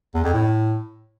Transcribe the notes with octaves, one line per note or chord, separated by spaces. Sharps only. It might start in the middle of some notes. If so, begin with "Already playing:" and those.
E2
F2
A2